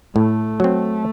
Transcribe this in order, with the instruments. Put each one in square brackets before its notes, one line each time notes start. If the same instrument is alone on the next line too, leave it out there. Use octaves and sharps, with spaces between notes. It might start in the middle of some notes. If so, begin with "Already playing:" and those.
[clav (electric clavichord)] A2 [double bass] A3
[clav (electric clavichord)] F#3 C4